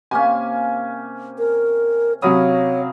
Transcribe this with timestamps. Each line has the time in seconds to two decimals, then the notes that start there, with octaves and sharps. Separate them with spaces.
0.11 C3 A#3 C#4 G#5
1.39 A#4
2.22 C3 F#3 C#4 C#5 F5 B5 D#6